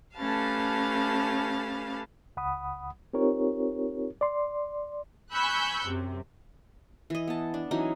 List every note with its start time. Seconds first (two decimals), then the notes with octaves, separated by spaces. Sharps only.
0.16 A3 C#4 G4 B4 F5 A5
2.37 C#2 F#5 B5 D#6
3.13 C4 D#4 F4 G4 A#4 C#5
4.21 D5 C6
5.33 G#5 B5 C#6 E6 F#6 G6
5.85 F#2 C3
7.10 E3 D#5
7.27 B3 A5
7.54 D4
7.71 E3 F#3 C#4 D#4